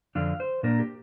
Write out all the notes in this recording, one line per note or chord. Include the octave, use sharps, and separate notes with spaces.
F2 D3 F3 D4 F5
C5
A#2 A#3 D4 A#4
G4